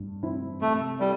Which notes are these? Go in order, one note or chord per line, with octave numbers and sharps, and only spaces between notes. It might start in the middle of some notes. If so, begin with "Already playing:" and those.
Already playing: G2
E3 C4 E4
C3 A3
G3 E4 A4